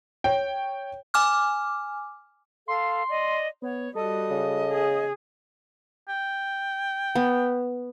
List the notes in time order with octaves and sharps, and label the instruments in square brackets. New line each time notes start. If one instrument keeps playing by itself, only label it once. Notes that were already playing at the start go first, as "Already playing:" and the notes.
[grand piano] C#5 G5
[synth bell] G#5 D6 F6
[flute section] A4 F5 [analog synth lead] C6
[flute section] D5 D#5
[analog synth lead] B3 [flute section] C#5
[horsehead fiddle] G3 F#4 [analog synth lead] A4 [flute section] D#5 D#6
[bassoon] C#3
[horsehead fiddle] G#4
[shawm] G5
[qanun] B3